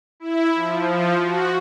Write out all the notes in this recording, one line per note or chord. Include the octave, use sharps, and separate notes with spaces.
E4
F3
F#4